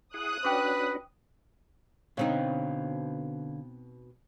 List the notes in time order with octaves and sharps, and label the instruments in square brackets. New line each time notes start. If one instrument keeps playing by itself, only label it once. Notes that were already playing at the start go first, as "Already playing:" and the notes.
[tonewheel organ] E4 G#4 F#5 [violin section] D#6 F#6
[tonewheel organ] C#4 D4 F#4 [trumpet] B4 [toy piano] C5 G5 D6
[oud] B2 C4 D#4 [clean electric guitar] D3 C#5 F5